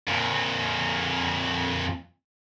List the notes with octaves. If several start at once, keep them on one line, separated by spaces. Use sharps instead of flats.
F2 A#2